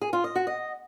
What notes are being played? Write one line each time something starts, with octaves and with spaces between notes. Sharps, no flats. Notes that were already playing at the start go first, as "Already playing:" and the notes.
G#4
F4
D#5
F#4
D#5